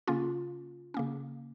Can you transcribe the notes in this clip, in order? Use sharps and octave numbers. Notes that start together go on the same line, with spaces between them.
C#3 A#3 C#4 F4
C#3 A#3 C#4